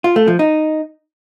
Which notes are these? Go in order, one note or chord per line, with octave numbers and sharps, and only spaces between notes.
F4
A3
F3
D#4